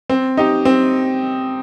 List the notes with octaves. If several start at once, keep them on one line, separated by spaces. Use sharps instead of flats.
C4
D#4 G4
C4